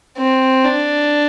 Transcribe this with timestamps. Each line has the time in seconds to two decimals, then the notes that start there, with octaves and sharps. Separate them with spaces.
0.18 C4
0.64 D4